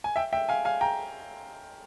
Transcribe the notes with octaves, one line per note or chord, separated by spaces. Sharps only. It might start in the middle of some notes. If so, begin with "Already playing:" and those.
G#5
E5 G5
E5 G5
F5 G#5
F5 G#5
G5 A#5